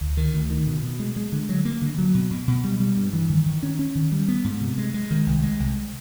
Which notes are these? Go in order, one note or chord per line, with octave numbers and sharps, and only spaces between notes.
D2
D#3
D2
D#3
B2
B2
G#3
G#3
D3
F#3
A#3
D3
F#3
B2
B2
B2
G3
G3
G2
E3
D#3
D#3
C#4
C#4
D#3
G3
B3
G#2
C3
G#3
G#3
D#3
C2
G#3
C2